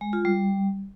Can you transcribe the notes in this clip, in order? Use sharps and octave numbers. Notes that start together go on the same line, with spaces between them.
G#3
F4
G3